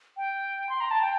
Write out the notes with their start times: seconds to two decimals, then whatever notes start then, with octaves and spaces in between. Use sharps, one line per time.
0.17 G5
0.69 C6
0.80 A#5
0.91 A5
1.02 G5